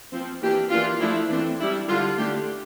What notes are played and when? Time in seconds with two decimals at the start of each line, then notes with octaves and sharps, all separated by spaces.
0.12 F3 C4
0.41 E3 A#3 D4 G4
0.70 E3 A#3 D4 F4
1.00 F3 A3 D4 E4
1.29 E3 A3 C4 D4
1.59 G3 D4 E4
1.88 D3 G3 D4 F4
2.17 D3 A3 D4 G4